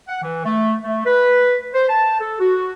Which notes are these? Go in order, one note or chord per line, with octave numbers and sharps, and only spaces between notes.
F#5
E3
A3
A3
B4
C5
A5
A4
F#4